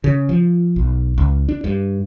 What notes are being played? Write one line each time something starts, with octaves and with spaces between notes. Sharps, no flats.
C#3
F3
B1
C#2
D4
G2